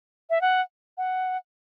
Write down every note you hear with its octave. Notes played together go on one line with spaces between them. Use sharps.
E5
F#5
F#5